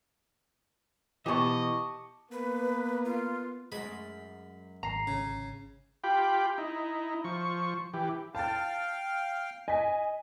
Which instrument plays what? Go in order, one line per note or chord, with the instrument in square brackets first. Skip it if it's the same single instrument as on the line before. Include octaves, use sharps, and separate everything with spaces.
[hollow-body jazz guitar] B2 E3 [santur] G4 A5 C#6 [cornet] D#5
[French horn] A#3 [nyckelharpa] B3 [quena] B4
[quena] F4
[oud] F#2 G#3 [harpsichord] B5 C6
[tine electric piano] G#1 C7 [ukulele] A#5
[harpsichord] C#3
[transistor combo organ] F4 G4 G5 B5
D#4 E4
F3 C#6
E3 G4
[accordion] F5 G5 [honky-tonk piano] A5 A6
[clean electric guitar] D#5 [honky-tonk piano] G#5 B6